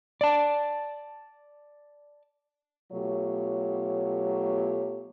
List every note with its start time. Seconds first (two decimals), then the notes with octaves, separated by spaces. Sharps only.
0.21 D5 A5
2.93 B2 F#3 A3 F4 G4 C#5